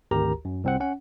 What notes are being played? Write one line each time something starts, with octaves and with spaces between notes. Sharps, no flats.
G#1 D2 G4 A#4 A#5
F#2
C2 C4 F#5
C#4 F#5